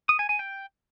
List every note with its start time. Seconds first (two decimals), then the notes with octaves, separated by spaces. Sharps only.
0.09 D#6
0.19 G#5
0.29 G#5
0.39 G5